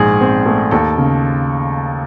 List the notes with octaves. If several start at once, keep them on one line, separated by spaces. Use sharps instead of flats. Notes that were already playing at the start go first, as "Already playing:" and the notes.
Already playing: A#1 G#2 G#4
C4
A3
D#2 A4
C#3